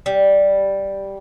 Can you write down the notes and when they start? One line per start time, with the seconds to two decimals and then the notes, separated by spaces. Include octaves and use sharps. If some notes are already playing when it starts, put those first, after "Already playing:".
0.06 G3